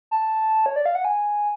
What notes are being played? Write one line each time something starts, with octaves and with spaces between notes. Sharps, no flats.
A5
C#5
D5
F5
F#5
G#5